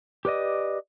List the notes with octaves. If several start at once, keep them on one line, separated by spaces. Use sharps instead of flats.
G4 B4 D5 D#5